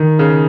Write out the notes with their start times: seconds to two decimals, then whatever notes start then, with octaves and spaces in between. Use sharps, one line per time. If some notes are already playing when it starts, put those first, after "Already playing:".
Already playing: D#3
0.19 C#3